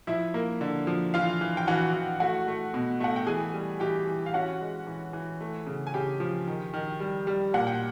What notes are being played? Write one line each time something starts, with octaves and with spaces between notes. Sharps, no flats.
F3 E4 E5
A#3
D3
F3
E3 F4 F5
E3
G5
E3 F#4 F#5
E3
A3 F#4 F#5
A3
B2
A3 F#5
G5
E3 G#4 G#5
G3
E3 G4 G5
E3
F5
C#4 F#4 F#5
G#3
E3
E3
A3
C#3
G#5
C#3 G4 G5
F3
D#3
D#3
G3
G3
A#2 F#5
G5